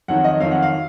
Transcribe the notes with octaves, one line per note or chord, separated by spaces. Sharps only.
F2 D#3 F#3 F#5
D#5
F2 D#3 F#3 F5
F#5
F5